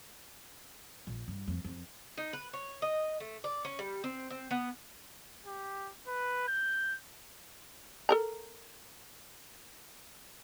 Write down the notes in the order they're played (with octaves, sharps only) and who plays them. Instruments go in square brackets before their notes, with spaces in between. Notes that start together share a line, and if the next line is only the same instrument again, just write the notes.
[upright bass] A#1
G2
F2
F2
[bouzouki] D#4
B4
C#5
D#5
A3
D5
C#4
G3
C4
C4
B3
[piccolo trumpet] G4
B4
G6
[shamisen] A4 A#4 A#5